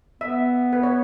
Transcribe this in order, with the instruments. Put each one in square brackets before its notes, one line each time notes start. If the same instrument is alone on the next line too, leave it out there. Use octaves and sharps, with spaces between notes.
[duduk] B3 [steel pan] E5
[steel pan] B4
C#5